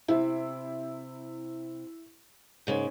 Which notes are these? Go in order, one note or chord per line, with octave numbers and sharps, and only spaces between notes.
C3 E4
G#2 C#3 A#3